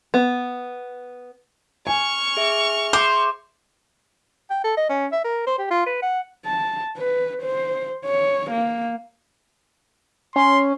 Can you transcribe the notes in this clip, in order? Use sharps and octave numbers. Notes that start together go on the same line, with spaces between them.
B3
G#5 C#6 F6
G#4 E5
C5 D6
G5
A4
D#5
C#4
E5
A#4
C5
G4
F4
B4
F#5
A5
B4
C5
C#5
A#3
C#4 C6